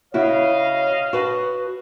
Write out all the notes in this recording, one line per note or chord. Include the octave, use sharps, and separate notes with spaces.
C#3 E4 F#4 C#5 D#5 F5
F#4 B4 A5